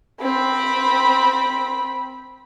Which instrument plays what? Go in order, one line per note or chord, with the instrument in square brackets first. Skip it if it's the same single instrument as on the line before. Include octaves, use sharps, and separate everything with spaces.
[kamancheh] C4 B5